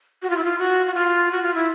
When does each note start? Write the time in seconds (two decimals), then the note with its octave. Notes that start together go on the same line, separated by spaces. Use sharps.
0.22 F#4
0.30 F4
0.37 E4
0.44 F4
0.59 F#4
0.86 F#4
0.94 F4
1.31 F#4
1.43 F4
1.54 E4